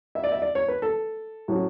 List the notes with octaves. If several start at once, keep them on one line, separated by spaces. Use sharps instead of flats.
E5
D5
E5
D5
C#5
B4
A4
A2 F#3 C#4